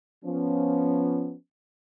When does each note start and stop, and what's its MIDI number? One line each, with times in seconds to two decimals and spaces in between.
0.25 1.35 53
0.25 1.35 59
0.25 1.35 61